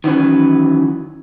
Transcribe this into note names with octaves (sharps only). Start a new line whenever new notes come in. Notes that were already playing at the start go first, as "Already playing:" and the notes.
D#3 E3 F#3 C#4 B4